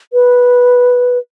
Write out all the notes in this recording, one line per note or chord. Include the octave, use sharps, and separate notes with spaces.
B4